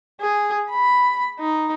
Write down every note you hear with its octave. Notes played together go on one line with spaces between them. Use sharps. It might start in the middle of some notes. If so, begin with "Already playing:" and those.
G#4
B5
D#4